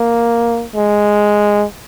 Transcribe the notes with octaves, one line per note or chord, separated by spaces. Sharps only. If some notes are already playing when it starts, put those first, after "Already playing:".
Already playing: A#3
G#3